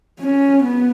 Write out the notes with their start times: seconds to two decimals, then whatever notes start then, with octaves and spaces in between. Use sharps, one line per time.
0.21 C#4
0.62 B3